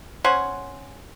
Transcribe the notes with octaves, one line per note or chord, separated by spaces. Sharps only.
C#4 C5 F#5 G#5